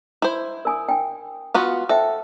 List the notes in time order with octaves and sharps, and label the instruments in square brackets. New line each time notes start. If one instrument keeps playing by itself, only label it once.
[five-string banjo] E4 C5
[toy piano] A#4 G#5 D#6
G5 G#5
[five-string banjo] B3 F4 F#4 [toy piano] F5 C#6
[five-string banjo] A4 [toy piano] C5 E5 G5